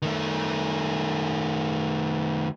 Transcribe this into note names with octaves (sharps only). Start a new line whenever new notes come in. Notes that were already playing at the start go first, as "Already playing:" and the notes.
D#3 A3